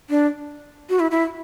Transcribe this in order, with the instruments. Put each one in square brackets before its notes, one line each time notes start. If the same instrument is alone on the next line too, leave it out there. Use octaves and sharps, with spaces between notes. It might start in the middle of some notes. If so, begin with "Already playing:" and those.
[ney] D4
F#4
E4
E4